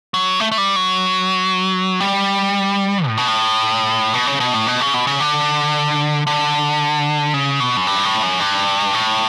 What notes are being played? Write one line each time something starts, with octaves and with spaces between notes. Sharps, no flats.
F#3
A3
A3
G3
F#3
G3
A2
B2
A2
B2
C#3
B2
A2
B2
C#3
B2
C#3
D3
D3
C#3
B2
F#2
G2
A2
F#2
G2
A2